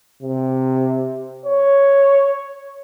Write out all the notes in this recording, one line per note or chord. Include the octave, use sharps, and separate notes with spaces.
C3
C#5